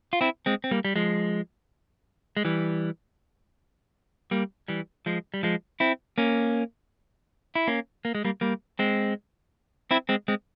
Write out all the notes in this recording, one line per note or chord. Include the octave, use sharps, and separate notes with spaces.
F4
C4 E4
G#3 C4
C4
G3 A#3
G3
F3 G#3
G#3
E3 G3
G3 A#3
E3 G3
F3 G#3
G3
F3 G#3
C4 E4
A#3 C#4
E4
A#3 C#4
A#3
G#3
G3 A#3
G3 A#3
G#3 C4
C4 E4
G#3 C4
G#3 C4